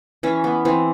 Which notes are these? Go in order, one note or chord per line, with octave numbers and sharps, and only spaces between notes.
E3 C#4
B3
E3 C4